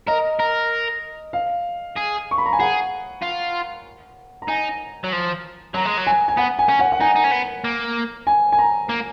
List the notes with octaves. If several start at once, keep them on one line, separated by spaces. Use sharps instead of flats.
A#4 D#5
A#4
F5
G#4
C#6
B5
A#5
G#5
G#4 F#5
F4
A#5
D#4 G#5
F#3
F3
F#3 A#5
G#3
F#3
G#5
G#5
B3 F#5
G#5
C#4
F#5
F#5
D#4 G#5
D#4
C#4
B3
A#3
G#5
G#5
A#5
A#3